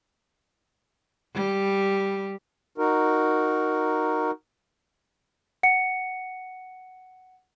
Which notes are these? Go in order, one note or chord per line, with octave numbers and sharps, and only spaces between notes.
G3
D#4 F#4 A#4
F#5 C#7